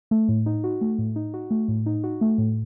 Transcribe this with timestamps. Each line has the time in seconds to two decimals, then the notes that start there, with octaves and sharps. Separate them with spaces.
0.11 A3
0.28 A2
0.46 D#4
0.64 F#4
0.81 A3
0.99 A2
1.16 D#4
1.34 F#4
1.51 A3
1.68 A2
1.86 D#4
2.04 F#4
2.21 A3
2.38 A2